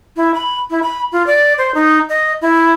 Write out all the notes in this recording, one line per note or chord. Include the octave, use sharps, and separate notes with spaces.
E4
B5
E4
B5
F4
D5
C5
D#4
D#5
E4